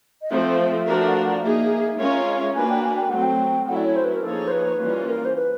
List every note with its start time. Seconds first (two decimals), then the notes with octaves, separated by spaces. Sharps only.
0.22 D#5
0.30 F3 A3 C4 E5
0.86 F3 A3 D4 F#4 A#4
1.08 F#5
1.15 F5
1.24 F#5
1.34 F5
1.42 A#3 D#4 G#4 E5
1.99 G#3 C#4 F4 A#4 C#5
2.27 D#5
2.34 F5
2.40 E5
2.55 A#3 D4 F#4 B4 G#5
2.69 G5
2.83 G#5
2.96 G5
3.10 F#3 A3 C4 F#5
3.22 G5
3.67 F#3 A3 C#4 E4 F#5
3.76 D5
3.85 C#5
3.96 C5
4.04 B4
4.14 A#4
4.23 F3 A#3 D#4 G#4 A4 C#5
4.48 C5
4.51 B4
4.79 E3 G3 A#3 C#4 F4
5.08 A#4
5.25 C5
5.36 B4